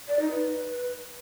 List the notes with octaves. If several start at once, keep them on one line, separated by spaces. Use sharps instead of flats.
D5
D#4
B4